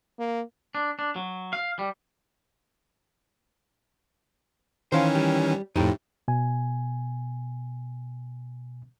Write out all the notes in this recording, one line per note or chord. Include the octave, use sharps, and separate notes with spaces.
A#3
D4
D4
F#3
F5
G3
D#3 E3 C#4 C5 F5 A5
G3
F2 A2 D#4 E4 G4
B2 G#5